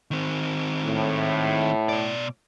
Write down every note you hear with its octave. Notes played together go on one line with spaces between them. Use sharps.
D#3 C4
A2
B2 D5